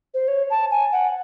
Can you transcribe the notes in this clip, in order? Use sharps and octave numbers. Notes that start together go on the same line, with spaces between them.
C5
C#5
A5
G#5
F#5